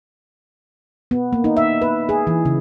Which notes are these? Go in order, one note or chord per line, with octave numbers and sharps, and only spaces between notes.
B3
A#3
D#4
E5
B4
G#4
E3
C#3